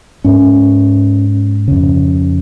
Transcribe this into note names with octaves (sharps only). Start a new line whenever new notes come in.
G#2 C#4
F2 C#3